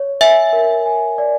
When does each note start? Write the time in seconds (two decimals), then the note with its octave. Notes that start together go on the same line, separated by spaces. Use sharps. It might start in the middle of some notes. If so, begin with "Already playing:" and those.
Already playing: C#5
0.21 E5 G#5
0.53 A#4
0.86 G#5
1.18 D5